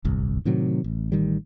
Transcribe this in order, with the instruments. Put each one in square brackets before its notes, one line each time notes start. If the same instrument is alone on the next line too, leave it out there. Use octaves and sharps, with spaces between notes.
[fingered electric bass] D1 G1 C2
A2 C3 D#3 F#3
A1
A1 D#3 G3